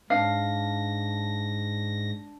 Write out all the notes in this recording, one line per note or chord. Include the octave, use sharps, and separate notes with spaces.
G#2 D4 F5 A#6